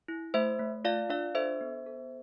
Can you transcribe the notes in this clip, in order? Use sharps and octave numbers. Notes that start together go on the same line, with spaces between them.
E4
A3 C5 E5
A3
F4 D5 F5
D4 D5 F5
A4 C5 E5
B3
A4